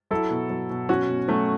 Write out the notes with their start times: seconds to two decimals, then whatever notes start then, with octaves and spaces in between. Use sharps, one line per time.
0.11 F#3 E4 A4
0.31 B2
0.50 F#3
0.70 B2
0.89 F#3 C#4 F#4
1.09 B2
1.28 F#3 A3 C#4